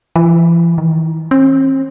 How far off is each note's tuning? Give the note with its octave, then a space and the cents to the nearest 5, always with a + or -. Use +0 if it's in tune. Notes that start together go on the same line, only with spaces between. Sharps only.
E3 +40
E3 -45
C4 +45